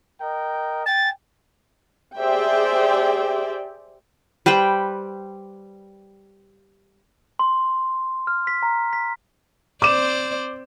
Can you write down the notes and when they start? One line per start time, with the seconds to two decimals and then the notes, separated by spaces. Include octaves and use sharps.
0.21 A#4 D#5 G5
0.86 G5 G#5 A6
2.20 G4 G#4 C5 D5 E5 G5
4.46 G3 B4 C5 G5
7.39 C6
8.27 F6
8.47 B6
8.63 A#5
8.93 B6
9.82 C4 C5 D5 D6 E7